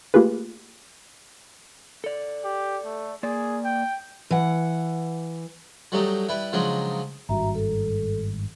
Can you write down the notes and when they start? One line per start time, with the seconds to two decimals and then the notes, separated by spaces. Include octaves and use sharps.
0.14 A3 A#3 F4 G4 G#4 B4
2.04 A4 D5
2.44 G4
2.85 A3
3.23 A#3 G#4 D5
3.64 G5
4.30 E3 F#5
5.92 F#3 G3 A3 D#4 G4
6.29 G3 E4 B4
6.53 C#3 F3 F#3 G#3 D4 D#4
7.29 G#1 G2 G3 F#4 E5 A#5
7.55 A4